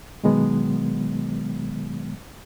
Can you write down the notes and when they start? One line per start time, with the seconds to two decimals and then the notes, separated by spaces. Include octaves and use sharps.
0.24 B2 D#3 F#3 G#3 B3